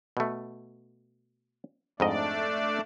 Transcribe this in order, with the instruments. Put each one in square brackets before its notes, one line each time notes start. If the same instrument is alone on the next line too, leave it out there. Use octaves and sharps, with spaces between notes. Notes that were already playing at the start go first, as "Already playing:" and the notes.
[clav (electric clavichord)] B2 A3
[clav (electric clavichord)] F2 G#2 D#5 [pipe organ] A3 D4 D5